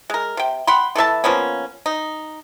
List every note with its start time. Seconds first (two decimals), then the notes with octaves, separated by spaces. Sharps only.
0.10 G#3 A#4
0.37 C3 G5
0.67 F#5 G5 B5 C6
0.95 E3 A4 E5 A5
1.24 F3 A#3 B3 C#4
1.86 D#4